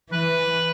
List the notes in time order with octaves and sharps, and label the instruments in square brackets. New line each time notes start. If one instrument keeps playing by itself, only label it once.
[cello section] E3 [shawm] B4